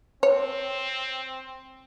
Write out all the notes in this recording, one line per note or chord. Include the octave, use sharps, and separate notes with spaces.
C4 C#5